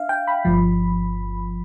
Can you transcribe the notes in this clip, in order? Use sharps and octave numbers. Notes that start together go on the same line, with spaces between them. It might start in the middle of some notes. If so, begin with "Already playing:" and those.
Already playing: D4 E5 F5
G5
B5
G1 G2 F3